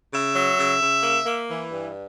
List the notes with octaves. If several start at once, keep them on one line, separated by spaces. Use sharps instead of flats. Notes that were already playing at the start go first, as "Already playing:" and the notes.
C#3 E5
F#3
C#3
C#3
A#3
A#3
E3
G2